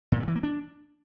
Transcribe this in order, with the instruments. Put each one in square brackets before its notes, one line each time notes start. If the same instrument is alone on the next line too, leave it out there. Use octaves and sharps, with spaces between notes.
[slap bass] A#2
C3
E3
A#3
D4